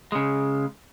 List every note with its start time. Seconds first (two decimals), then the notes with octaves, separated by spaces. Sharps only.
0.12 C#3 G#3